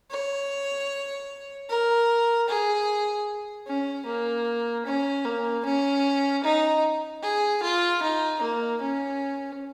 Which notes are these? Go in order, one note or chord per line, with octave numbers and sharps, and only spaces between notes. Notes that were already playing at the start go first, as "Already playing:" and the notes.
C#5
A#4
G#4
C#4
A#3
C#4
A#3
C#4
D#4
G#4
F4
D#4
A#3
C#4